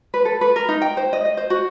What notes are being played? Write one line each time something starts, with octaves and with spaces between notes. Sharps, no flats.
B4
A4
B4
A#4
D#4
G5
C5
D#5
D#5
C5
F#4